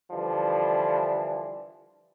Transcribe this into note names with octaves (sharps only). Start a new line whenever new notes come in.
D3 E3 F3 G3 D4